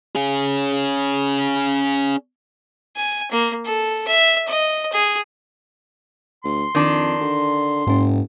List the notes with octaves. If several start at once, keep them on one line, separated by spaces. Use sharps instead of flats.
C#4 G#4
G#5
A#3
A4
E5
D#5
G#4
D2 C6
F2 D#3 D4
D3
F#1 G#2 C#4